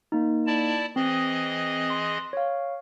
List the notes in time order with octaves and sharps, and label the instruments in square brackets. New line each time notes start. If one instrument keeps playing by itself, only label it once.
[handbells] A#3 D#4
[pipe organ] E4 D5 A5
[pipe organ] E3 G#4 D#5 [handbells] C4
[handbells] C6
C#5 F5